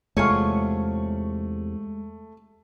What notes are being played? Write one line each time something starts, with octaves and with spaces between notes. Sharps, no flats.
E2 C3 G#3 A3 F4 G#4 C#5 C#7